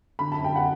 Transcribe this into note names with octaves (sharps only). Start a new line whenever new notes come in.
D3 B5
F#2 A5
G5
F#5